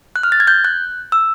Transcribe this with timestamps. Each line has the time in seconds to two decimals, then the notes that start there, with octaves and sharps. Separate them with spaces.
0.16 F#6
0.23 F6
0.32 A6
0.40 G#6
0.48 G6
0.64 F#6
1.12 E6